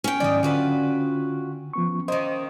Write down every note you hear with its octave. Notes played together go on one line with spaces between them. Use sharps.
C#4 G5
G#2 D#3 F#3 D5 D#5
D3 F4 F#4 B4
F3 B3 C#6
D#3 A#3 C5 D#5